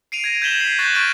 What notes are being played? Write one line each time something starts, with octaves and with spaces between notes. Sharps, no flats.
C7 D7 D#7 F7
G#6 A#6
G6 G#6 B6 E7 F#7 G7
G#6 B6 C7
C#6 F#6 G6 A6 E7 F#7
C#6 F6 D7